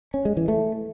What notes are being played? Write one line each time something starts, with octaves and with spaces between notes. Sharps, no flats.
C#4
G#3
E3
A3